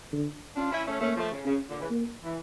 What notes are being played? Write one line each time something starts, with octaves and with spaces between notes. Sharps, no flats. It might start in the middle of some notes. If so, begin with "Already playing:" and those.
D3
C#4 D4 F4
C#4 E4
A3 C#4
A3 A#3 C#4
F3 A3
C#3
C#3 C#4
A#2 D3
C#3 E3
A#3
E3